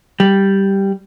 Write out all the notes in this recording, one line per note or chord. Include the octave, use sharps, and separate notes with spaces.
G3